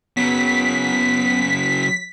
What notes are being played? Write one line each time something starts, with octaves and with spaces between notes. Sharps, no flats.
C#3 F#3 B3 B6